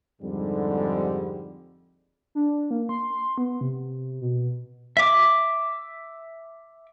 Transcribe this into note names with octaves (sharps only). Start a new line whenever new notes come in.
F2 G#2 D3 G3
D4
A#3
C6
B3
C3
B2
E5 D6